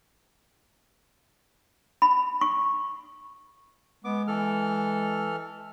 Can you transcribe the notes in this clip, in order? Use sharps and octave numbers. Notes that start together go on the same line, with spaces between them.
B5
C#6
G#3 B3 D6
E3 A4 F6